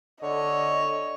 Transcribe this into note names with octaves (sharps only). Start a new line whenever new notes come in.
D3 C#5 D#5